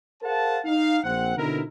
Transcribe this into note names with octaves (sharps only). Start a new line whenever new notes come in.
G#4 A#4 C5 F5 F#5 A5
D#4 F5
A#1 C4 F#5
B2 D3 C4 D#4 E4 A#4